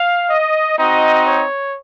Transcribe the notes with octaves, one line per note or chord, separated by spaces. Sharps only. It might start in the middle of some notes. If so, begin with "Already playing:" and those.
Already playing: F5
D#5
C4 D#4 F#4 D#5
C#5